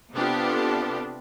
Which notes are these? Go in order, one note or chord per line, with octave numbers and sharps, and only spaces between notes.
C3 B3 D4 F4 G4 A4